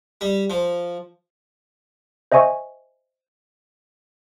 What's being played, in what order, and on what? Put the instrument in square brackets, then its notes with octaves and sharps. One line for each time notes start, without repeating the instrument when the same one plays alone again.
[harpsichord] G3
F3
[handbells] C5 D#5 E5 G#5 C#6